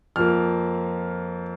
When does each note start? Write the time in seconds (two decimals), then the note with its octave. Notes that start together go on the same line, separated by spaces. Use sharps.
0.16 F2 F3 A#3 F6